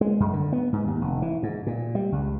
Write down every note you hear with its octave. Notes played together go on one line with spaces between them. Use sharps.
G#3
F#2
D3
B3
G#2
D#2
F1
E3
G#2
A#2
G3
C#2